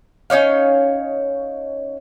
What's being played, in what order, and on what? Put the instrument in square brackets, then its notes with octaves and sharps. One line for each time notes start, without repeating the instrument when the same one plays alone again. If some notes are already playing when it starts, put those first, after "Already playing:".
[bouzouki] C#4 D#4 C#5 F5